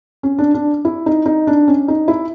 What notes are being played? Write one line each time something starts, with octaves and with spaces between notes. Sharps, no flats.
C#4
D4
D4
E4
D#4
D#4
D4
C#4
D#4
E4